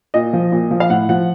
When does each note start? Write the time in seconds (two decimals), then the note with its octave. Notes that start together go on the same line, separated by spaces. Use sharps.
0.14 A#2 D#5
0.33 F3
0.52 A#2
0.71 F3
0.80 F5
0.90 A2 F#5
1.09 F3 F#5